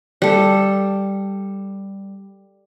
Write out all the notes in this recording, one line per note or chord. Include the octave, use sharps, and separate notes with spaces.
G3 A4